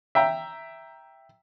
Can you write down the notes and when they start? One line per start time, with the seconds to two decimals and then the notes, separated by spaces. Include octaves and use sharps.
0.15 E5 G5 A#5